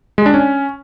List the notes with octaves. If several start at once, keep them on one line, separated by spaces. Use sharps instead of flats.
G#3
D4
C#4